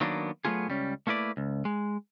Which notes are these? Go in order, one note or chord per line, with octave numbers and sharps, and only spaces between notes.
D#3 F#3 A#3 B3 D4
F#3 A3 B3 F4 G#4
C#2 G3 C#4
A3 A#3 E4 B4 D5
C#2
G#3